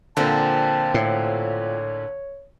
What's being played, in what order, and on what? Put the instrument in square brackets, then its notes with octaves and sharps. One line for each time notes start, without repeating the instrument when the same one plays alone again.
[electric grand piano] A#2 D3 [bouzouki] F3 C4 [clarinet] A5
[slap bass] A2 [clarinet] C#5